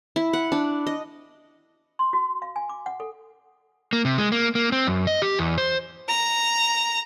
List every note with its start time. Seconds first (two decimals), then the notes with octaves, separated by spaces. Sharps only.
0.16 E4
0.33 F#5
0.52 D4
0.87 D#5
1.99 C6
2.13 F#4
2.42 F5
2.56 G#5
2.69 D6
2.86 F#5
3.00 A4
3.93 A#3
4.05 C3
4.18 G#3
4.32 A#3
4.55 A#3
4.72 C4
4.87 F#2
5.07 D#5
5.22 G4
5.39 E2
5.58 C5
6.09 A#5